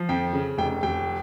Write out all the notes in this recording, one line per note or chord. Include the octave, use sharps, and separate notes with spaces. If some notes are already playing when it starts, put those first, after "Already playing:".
Already playing: F3
F2 G5
C#3
F1 G5
F1 G5